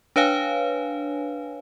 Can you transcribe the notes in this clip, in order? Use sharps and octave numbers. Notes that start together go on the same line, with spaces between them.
D4 B4 C#5 F5 G#5